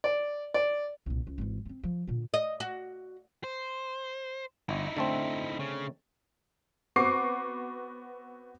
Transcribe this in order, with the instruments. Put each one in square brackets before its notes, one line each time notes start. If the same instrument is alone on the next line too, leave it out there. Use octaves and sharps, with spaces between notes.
[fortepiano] D5
D5
[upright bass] C2 A#2
C#2
G#1 E3
B3 C4
F3
A#2 D3
[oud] D#5
F#4
[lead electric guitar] C5
[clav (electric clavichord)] G1 [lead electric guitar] D#4 E4
[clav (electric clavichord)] D3 A3 C4
[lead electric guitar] C#3
[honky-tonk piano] B3 C4 F#4 C#6 D6 C7